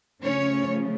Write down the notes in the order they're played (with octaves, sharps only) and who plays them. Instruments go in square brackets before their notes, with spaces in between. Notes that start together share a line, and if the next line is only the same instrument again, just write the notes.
[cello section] C#3 F3 A3 C#4 C#5